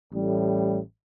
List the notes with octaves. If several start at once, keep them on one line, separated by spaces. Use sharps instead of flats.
A1 A2 G3